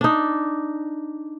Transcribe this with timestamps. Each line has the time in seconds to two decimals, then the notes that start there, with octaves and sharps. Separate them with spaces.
0.01 D4 D#4